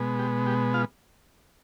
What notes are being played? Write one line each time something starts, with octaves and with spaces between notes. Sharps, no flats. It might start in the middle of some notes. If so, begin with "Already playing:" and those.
Already playing: B2 G#3 B3
G4
G4
F4 F5